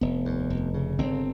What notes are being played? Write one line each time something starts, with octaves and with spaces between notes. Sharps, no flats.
F1 B3
D#2
F1
C#3
G1 C4